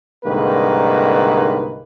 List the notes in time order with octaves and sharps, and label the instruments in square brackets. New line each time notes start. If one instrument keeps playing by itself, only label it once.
[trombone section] C2 G#2 D3 D#3 A#3 B4